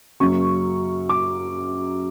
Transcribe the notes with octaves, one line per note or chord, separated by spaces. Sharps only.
F#2 C#3 F#3 A#3 C#4 C#6
D6